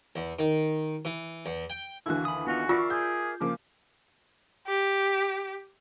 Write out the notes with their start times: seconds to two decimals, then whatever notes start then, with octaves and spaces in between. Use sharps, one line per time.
0.16 E2
0.39 D#3
1.05 E3
1.46 E2
1.70 G5
2.06 D#2 D3 E3 E4 F#4
2.25 B5 D#6
2.47 B3 D#4 F4 F#4
2.69 F4 A#4 D5 E5 C#6 C7
2.90 G#4 G6
3.41 C#3 F3 A#3 D6
4.67 G4